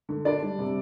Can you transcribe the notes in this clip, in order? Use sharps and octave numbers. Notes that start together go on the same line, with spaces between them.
D3
D4 D5
G3
C3